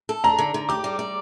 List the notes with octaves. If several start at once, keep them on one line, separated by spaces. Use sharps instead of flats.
A4
D4 A#5
D3
D3
G4 D6
G3
D5